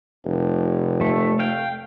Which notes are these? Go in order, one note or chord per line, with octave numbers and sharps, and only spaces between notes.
F1
A3
F5 G5